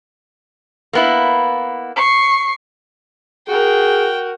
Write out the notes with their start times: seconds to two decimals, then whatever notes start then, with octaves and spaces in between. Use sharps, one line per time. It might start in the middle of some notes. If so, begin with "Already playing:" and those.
0.93 A#3 B3 E4
1.96 C#6 C7
3.48 F#4 G#4 A#4 G5